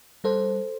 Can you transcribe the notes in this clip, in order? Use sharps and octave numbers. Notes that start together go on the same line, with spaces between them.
G3 A4 C5